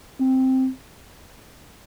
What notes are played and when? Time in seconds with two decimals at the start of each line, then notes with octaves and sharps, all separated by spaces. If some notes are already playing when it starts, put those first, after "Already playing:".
0.20 C4